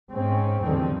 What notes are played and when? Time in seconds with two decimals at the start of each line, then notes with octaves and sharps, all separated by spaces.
0.12 G#2 C4 C#4
0.63 E2 D3 D#3 F3 G3 C4